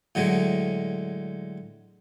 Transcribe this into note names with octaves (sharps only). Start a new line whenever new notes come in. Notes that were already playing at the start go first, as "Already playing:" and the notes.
A2 D3 F#3 G#3